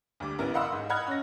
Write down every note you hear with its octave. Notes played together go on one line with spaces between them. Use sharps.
D2 G3 D6
A1 B3 E4 A#4
D#5 F5 F#5 B5 C6 E6
G#2
D#5 F#5 B5 F6 F#6 G#6
C#4 A#6